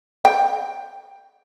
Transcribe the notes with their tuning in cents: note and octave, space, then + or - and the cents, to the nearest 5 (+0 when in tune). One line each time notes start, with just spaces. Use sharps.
G5 +10